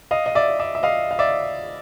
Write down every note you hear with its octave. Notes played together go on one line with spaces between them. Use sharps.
D#5 F5
D#5
D5 E5
D5 E5
E5
D#5 F5
F5
D5 E5